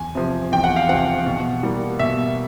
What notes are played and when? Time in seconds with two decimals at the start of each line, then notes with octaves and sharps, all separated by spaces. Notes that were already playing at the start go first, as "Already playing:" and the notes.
Already playing: E2 G#5
0.15 C3 F3
0.52 E2 G5
0.64 F#5
0.76 F5
0.89 C3 F3 F#5
1.26 B2
1.63 G3 A#3
1.99 B2 E5